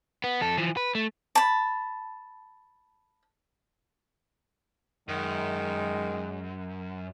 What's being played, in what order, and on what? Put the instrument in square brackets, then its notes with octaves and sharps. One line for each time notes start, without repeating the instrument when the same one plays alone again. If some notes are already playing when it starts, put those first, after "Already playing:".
[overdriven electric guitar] B3
F2 A4
E3 F3
B4
A3
[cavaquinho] A5 B5
[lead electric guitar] F#2 [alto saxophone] D#3 [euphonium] G#3